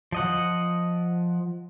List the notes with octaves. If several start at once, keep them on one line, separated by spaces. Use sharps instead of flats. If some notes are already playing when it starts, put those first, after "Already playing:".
F3 D#5 F#5